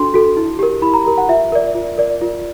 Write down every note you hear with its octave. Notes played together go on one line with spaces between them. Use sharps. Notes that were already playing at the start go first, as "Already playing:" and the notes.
Already playing: D4 F#4 A4 C6
F#4 A4
E4
G4 A#4
E4 B5
A#5
G4 A#4
F#5
F4 E5
A#4 D5
F4
A#4 D5
F4